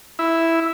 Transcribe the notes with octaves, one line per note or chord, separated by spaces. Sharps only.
E4